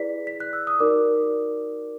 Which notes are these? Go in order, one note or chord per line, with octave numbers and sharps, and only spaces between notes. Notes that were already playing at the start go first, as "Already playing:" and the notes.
Already playing: E4 G#4 B4 D5 B6
B6
F#6
E6
D#6
D#4 F#4 A#4 D5 D6